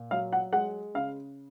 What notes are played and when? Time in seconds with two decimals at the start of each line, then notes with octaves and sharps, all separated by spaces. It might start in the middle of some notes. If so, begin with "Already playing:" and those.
Already playing: A#2
0.11 F#3 F5
0.33 F#5
0.53 G#3 F#5
0.95 C#3 F5